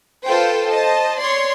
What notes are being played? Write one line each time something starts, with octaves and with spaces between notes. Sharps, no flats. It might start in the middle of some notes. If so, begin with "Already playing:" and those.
F4 A4 B4 C5 G5
C5 D#5 A5
C#5 D5 C6